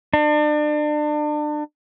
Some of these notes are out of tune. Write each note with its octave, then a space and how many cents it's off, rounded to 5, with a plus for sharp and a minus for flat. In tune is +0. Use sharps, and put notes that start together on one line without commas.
D4 +35